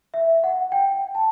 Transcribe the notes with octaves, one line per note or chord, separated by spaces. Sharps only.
E5
F#5
G5
A5